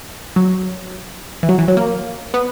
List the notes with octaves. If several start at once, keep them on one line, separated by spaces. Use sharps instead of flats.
F#3
E3
F#3
E3
F#3
A#3
B3